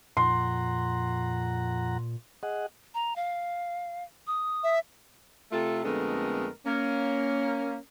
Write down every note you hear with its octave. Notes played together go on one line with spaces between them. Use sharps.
F2 A#2 F#5 A#5 C6
G#4 D#5 F#5
A#5
F5
D#6
E5
C3 A3 F4 A4
F2 D3 G#3 A3 B3 A#4
A#3 C#4